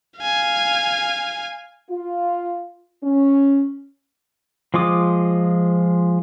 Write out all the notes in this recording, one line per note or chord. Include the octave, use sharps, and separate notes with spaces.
F5 G#5
F4
C#4
F3 G#3 F4 D6 D#6